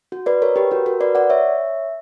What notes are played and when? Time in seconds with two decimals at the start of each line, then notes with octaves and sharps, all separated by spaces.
0.12 F#4
0.26 B4 D5
0.42 A#4 C#5
0.56 G4 B4
0.71 F#4 A#4
0.86 F#4 A#4
1.01 B4 D5
1.15 D5 F#5
1.30 C#5 E5